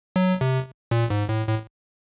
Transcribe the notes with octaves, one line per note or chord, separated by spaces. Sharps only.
F#3
C3
A#2
G#2
A2
A2